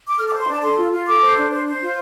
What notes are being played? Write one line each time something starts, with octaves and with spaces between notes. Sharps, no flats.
D6
A4 F6
D6
C5
C6
D4 A5
A4 C6
F4
F4
A4 D6
C5
D4
C5
C5
F4